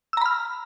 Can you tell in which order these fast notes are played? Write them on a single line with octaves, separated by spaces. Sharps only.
E6 A#5 B5 F6